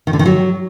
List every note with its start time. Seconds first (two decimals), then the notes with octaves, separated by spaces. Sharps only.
0.07 D#3
0.13 D3
0.19 D#3
0.26 F#3